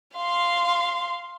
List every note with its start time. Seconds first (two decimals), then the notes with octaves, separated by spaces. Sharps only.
0.16 F5 C6